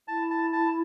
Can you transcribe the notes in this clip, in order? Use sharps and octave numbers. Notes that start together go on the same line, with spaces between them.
E4 A5
A5
A5